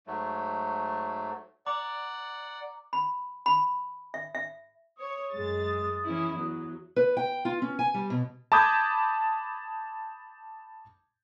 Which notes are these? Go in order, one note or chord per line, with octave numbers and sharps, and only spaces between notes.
G#2 F#3 A3
D5 F#5 A#5 D6
B5
B5
E5
E5
C#5 D#6
F#2 G#3 A6
E3 C#4 E4
E2 F#3
B4
G5
F4
C#4
G#5
G3
B2
A5 B5 D6 D#6 G6 G#6